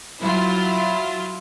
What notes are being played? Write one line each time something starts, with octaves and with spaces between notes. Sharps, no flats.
F#3 E4 F4